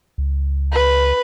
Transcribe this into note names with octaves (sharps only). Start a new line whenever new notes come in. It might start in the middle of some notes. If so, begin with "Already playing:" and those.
C#2
B4